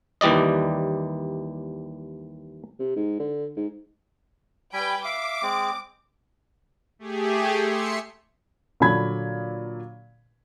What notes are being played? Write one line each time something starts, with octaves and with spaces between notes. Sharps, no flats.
D#2 E3 G3 D5 D#5
C3
G#2
D3
G#2
G3 B4 G5 G#5 B5
E5 F5 D6
G#3 C4
A3 G4 G#4
E5 C6 C#7
A#2 D3 F#3 B5 G#6